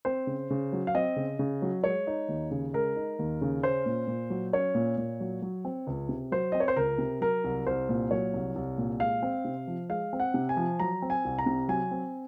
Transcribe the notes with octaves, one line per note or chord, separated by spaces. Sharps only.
C4 C5
C#3
C#3
F#3
F5
C4 D#5
C#3
C#3
F#3
G#3 C#5
D#4
D#2
C#3
G#3 A#4
D#4
D#2
C#3
C#4 C5
A#2
A#2
F#3
C#4 C#5
A#2
A#2
F#3
F#3
C4
C#2
C3
F#3 C5
C4 D#5
C#5
C5
C#2 A#4
C3
F#3 A#4
C2
C2 C5
A#2
F#3 C#5
C2
C2
A#2
G#3 F5
C4
C3
F3
G#3 F5
C4
F#5
C3
G#5
F3
F#3 A#5
C4
G#5
C2
A#5
C3
F#3 G#5
C4